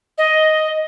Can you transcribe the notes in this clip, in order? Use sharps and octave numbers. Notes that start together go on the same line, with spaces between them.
D#5